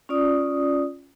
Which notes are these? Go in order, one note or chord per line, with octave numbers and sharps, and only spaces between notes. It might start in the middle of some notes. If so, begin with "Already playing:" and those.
C#4 F4 D5 D#6